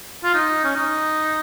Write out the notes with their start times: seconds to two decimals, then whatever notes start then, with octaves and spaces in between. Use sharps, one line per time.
0.24 F4
0.34 D#4
0.64 C#4
0.75 D#4